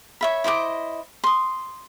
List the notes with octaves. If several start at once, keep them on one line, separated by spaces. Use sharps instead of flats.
C#5 E5 B5
E4 C5 D#5 D6
C6 D#6